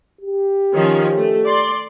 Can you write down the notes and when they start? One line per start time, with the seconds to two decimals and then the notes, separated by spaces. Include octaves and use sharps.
0.21 G4
0.75 D#3 F3 C#4
1.16 A3
1.47 D5 C6